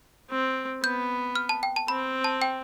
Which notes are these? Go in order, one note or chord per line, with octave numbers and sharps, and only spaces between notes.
C4
B3 G6
F6
A5
G5
A5
C4 B5
A5
G5